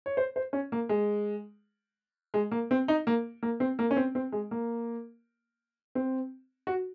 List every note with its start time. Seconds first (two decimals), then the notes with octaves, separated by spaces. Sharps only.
0.06 C#5
0.17 C5
0.36 C5
0.53 C#4
0.72 A#3
0.89 G#3
2.34 G#3
2.51 A#3
2.71 C4
2.88 D#4
3.07 A#3
3.43 A#3
3.60 C4
3.79 A#3
3.91 C#4
3.96 C4
4.15 C4
4.32 G#3
4.51 A#3
5.95 C4
6.67 F#4